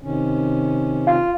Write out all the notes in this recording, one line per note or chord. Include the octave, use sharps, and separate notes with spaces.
C3 D#3 C#4
F4